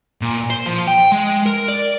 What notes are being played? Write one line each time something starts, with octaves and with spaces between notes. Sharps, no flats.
A#2
C5
F3
G5
G#3
A#4
D5